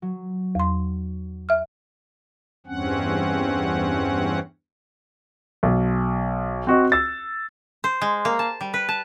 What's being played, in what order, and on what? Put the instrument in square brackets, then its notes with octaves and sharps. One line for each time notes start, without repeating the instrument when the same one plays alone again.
[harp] F#3
[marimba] E2 C6
E5 F6
[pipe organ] E2 G2 C4 C#4 F#5
[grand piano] B1
C4 F#4 D#5
E6 A6
[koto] C5
G#3
A#3
A5
G3
B4
A5